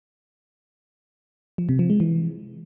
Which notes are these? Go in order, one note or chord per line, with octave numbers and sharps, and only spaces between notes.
F3
C3
F3
G#3
E3